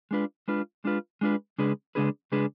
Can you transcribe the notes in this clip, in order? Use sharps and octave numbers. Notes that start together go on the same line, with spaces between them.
G#3 D4 F4 B4
G#3 D4 F4 B4
G#3 D4 F4 B4
G#3 D4 F4 B4
C#3 G#3 D4 G#4 B4
C#3 G#3 D4 G#4 B4
C#3 G#3 D4 G#4 B4